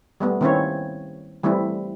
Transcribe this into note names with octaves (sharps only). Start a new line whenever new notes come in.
G3 A3 B3
D#3 A#3 C4 C#4 E4 C#5
E3 G3 A3 C4 E4